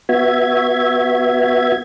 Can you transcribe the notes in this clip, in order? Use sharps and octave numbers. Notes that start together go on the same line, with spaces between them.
B3 F#4 E5 G#6